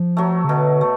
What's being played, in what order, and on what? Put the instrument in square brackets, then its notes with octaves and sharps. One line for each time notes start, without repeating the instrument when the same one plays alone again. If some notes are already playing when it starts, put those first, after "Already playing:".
Already playing: [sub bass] F3
[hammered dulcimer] F#3 A3
[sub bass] C#3
[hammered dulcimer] B2 [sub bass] D3
[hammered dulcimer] A3